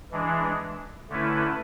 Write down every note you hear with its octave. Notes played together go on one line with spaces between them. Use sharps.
E3 G#3 D4
D3 A3 C#4 E4 B4